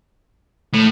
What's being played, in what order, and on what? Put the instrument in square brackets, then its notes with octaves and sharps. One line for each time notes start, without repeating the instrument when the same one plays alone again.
[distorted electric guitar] A2